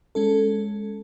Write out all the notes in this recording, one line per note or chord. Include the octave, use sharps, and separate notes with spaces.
G#3 C#4 A4